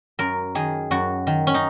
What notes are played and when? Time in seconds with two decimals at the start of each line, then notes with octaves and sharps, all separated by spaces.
0.19 F#2 A#4
0.55 D#3 G#4
0.91 F#2 F#4
1.27 D#3
1.47 C#4
1.54 D#4